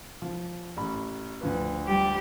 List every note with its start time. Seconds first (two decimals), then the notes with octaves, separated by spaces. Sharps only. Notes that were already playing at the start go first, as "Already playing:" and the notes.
0.22 F3
0.77 A1 B5
1.41 D2 F3 B4
1.86 G3 G4